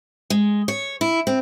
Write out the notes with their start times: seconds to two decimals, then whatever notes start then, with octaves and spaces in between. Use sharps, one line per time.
0.30 G#3
0.68 C#5
1.01 E4
1.27 C4